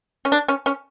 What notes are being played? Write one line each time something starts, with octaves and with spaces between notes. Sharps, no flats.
C#4
D4
C#4
C#4